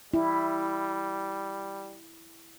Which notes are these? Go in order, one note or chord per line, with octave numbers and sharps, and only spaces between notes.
G3 E4